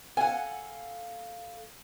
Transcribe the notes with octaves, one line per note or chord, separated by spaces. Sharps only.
A4 F5 F#5 G#5